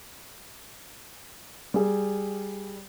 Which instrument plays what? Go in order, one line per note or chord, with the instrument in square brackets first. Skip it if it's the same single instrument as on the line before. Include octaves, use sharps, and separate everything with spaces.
[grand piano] G3 G#4